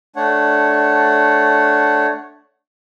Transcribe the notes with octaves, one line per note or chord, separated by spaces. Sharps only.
A3 D4 C#5 F#5